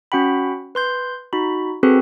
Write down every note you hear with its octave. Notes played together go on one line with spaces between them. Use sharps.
C#4 F#4 F#5 G5 B5
B4 C6 G6
D#4 F#4 B5
C4 F#4 G#4 A4 B4